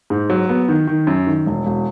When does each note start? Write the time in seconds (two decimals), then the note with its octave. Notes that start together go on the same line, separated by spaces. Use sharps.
0.10 G#2
0.30 F#3
0.49 B3
0.68 D#3
0.87 D#3
1.07 F#2
1.27 D#3
1.46 E1
1.66 E1